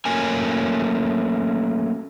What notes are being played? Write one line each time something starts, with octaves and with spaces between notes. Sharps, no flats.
F#3 A3 A#3 C#4 A#4 G#5